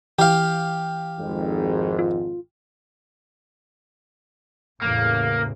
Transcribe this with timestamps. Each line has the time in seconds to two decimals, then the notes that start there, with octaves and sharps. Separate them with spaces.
0.19 E3 G4 F5
1.20 G#1 F2 G#2
1.99 F4
4.83 A1 E2 C#3 A#3